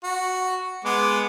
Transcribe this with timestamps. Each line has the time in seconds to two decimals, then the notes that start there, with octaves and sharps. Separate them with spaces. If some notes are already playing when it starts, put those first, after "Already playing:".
0.04 F#4
0.85 G#3 B3 D6